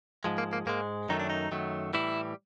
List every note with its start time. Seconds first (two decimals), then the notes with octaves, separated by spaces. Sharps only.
0.24 G#2 F3 G#3
0.38 A#3
0.53 A#3
0.66 G#2 F3 G#3 A#3
1.09 F#2 D#3 F#3 A3 D#4
1.20 D4
1.30 D#4
1.51 F#2 D#3 F#3 A3
1.93 A2 E3 G3 E4